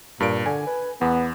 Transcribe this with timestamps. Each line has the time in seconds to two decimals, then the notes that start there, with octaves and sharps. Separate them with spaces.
0.20 G2 A#2 D7
0.46 D3 G#5
0.67 B4
1.01 E2 B3